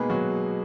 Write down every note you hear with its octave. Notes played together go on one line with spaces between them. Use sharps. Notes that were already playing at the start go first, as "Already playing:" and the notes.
Already playing: B2 G#3 A#3 B3 D#4 G#4 B4
F#3 F#4